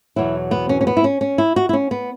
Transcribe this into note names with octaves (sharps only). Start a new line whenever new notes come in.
E2 B2 F#3 E4
B3
C#4
C#4
B3
E4
C#4
C#4
E4
F#4
E4
C#4
B3